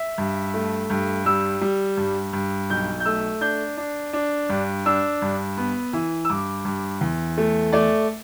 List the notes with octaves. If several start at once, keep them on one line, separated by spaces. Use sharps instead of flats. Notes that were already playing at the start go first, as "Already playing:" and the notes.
Already playing: E5
G2
A3
G2
G3 E6
G3
G2
G2
B1 G6
G6
A3 E6
D4 G6
D4
D4
G2
D4 E6
G2
B3
E3
E6
G2 D6
G2
E2
A3
A3 D5